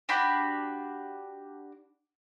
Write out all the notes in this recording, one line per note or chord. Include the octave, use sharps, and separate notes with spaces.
D4 F#4 G4 B5